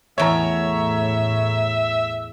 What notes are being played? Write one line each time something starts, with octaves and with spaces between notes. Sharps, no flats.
E2 A2 A4 C#5 E5 A#5